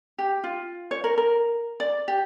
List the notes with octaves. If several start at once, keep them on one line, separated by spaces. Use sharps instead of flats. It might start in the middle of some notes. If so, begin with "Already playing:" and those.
G4
F4
C#5
A#4
A#4
D5
G4